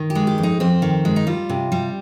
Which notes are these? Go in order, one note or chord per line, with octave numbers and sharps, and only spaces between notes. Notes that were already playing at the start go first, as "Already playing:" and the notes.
Already playing: D#3
G4
G#3
G4
F2
D#4
F2 C4
D#3
G#3
D#4
G3 F4
C3
G3